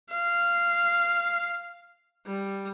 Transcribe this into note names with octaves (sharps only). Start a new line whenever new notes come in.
F5
G3